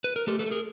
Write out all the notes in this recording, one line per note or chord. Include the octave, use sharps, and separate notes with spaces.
B4
A#4
A3 G4 A4
A4 B4
A3
G#4 A#4